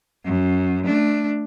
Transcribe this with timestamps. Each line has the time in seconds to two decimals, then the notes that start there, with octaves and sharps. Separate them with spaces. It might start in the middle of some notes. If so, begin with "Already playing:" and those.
0.25 F#2
0.85 A3 D4